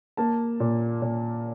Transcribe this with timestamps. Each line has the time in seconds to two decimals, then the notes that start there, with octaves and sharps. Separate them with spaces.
0.17 A#3 A5
0.60 A#2
1.02 A#2